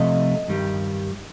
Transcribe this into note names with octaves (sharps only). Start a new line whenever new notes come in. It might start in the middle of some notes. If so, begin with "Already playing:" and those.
Already playing: C3 F3 A3 D#5
G2 D#3 G3